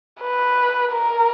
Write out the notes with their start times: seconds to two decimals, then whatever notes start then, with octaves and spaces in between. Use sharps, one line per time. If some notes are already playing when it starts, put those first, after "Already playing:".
0.21 B4
0.92 A#4